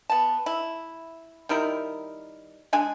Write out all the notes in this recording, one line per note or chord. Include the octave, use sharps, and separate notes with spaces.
B3 A5
E4
D#3 G3 E4 A#4
G#3 D4 G#4 G#5